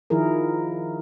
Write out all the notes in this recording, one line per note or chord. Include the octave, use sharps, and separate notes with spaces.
D#3 F3 E4 G#4 A#4